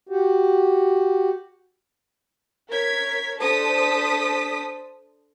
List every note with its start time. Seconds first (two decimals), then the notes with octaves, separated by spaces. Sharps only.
0.09 F#4 G4
2.69 A#4 C#5 G#6 B6
3.39 D4 A4 C5 A5 D#6 B6